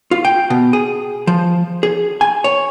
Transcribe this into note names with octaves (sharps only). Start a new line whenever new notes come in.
F4
G5
B2
G#4
F3
G#4
G#5
C#5